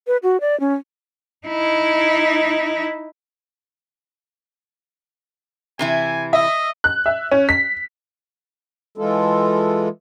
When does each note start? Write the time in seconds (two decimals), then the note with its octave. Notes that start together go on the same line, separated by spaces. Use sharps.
0.07 B4
0.23 F#4
0.41 D5
0.60 C#4
1.47 D#4 E4
5.79 C3 E3 E4 G#5
6.33 D#5 E5
6.84 F#6
7.06 E5
7.31 C#4
7.49 B6
8.98 E3 G#3 F4 A4